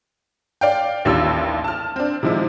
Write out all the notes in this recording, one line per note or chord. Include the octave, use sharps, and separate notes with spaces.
D5 F5 G5
A1 D#2 D4 F4 G4 E6
A5 F6
C4 D4
C3 D#3 F3 G#3 E4